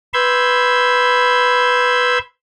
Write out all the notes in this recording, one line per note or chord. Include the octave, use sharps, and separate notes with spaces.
B4 B5 C6 E6 G6 G#6